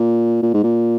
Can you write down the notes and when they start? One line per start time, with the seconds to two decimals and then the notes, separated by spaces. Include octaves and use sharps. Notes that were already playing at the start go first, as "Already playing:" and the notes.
Already playing: A#2
0.43 A#2
0.54 G#2
0.64 A#2